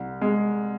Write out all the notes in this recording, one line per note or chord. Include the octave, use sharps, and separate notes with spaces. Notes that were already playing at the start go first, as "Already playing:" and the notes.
Already playing: C2
G#3